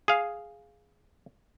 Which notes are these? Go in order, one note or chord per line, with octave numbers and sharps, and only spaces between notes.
G#4 F5